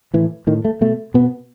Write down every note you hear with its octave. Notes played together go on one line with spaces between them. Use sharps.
A2 E3
A2 D#3
A3
B2 A3
B2 B3